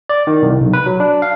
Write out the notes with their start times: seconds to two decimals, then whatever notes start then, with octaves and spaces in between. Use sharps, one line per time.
0.09 D5
0.27 D#3
0.42 C2
0.60 B1
0.73 B4
0.86 F#3
1.00 D4
1.22 F5